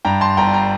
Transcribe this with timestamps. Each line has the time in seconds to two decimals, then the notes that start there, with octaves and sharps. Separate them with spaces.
0.05 G2 G5 A#5
0.21 A5 C6
0.37 G1 G5 A#5
0.54 G5 A#5